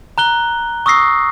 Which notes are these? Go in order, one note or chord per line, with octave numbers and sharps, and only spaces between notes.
A#5 F#6 G7
C#6 D#6 E6 A#6 C7